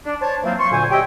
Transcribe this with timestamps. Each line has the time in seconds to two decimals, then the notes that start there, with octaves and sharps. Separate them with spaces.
0.05 D4
0.20 C5 C#5 A5
0.44 E3 F#3 A#3 C4 F4
0.58 C6 C#6
0.71 D2 A#2 D3 C5 G#5
0.91 G4 C#5 D#5 E5 G5